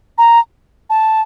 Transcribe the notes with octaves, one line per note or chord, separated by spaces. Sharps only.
A#5
A5